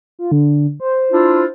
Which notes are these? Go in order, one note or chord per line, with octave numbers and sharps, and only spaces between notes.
F4
D3
C5
D4 E4 F4